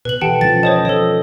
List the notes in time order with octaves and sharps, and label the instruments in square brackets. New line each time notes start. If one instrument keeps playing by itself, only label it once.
[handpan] B2 [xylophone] B4 F#7
[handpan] E3 G4 A4 [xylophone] F#5 G5 A5
[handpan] F3 G#3 C#4 [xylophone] A6
[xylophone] C5 C#5 A5 [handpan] D#5
[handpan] F3 [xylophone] A4 C#5